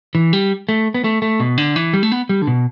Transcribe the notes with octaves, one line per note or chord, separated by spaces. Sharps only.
E3
G3
A3
B3
A3
A3
B2
D3
E3
G3
A3
B3
G3
D3
B2